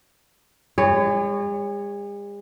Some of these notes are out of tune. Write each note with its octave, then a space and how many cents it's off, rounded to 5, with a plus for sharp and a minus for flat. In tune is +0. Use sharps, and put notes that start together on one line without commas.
G#3 -45 C#5 +0